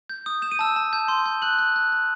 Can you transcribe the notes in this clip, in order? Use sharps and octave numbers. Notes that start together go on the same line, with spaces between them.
G6
D#6
G6 E7
D#7
A5 E6 E7
A5
G6
C6
G6
C6 F#6 F#7
F#6
F#6
F#6